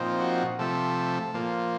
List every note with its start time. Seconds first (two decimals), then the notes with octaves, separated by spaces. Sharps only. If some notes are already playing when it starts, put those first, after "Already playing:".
Already playing: A#2 F3 C4 D#4
0.20 F#4
0.59 C3 F3 A3 A4
1.34 A#2 F3 A#3